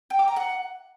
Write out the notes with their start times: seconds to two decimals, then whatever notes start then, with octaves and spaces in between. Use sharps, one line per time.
0.10 G5
0.19 D6
0.28 A#5
0.36 F#5